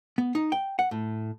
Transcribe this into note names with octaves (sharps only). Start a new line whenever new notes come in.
B3
D#4
G5
F#5
A2